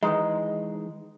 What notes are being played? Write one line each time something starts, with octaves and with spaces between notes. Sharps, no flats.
D#3 E3 G#3 D#4